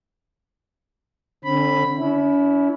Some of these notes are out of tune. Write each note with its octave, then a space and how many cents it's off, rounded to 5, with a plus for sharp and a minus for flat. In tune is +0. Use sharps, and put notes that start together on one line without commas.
D3 +0 C4 +45 B5 +0
C#4 +40 E4 -15